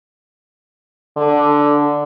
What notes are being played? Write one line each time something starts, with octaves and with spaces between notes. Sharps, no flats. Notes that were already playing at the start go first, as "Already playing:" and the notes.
D3